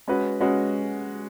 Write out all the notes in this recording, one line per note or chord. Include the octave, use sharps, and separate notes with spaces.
G#3 C#4 F#4 B4
G#3 C#4 F#4 B4